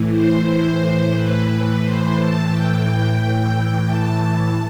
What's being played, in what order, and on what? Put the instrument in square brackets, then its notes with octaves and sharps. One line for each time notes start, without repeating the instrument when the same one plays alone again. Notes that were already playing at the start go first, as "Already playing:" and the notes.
Already playing: [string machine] A2 E3
C5
A2 E3 C5
B4
A2 E3 C5
A5
G5
A2 E3
A5